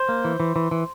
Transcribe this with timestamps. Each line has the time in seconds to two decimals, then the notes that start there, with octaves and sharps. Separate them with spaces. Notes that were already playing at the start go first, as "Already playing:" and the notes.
Already playing: C5
0.09 A#3
0.25 E3
0.40 E3
0.56 E3
0.71 E3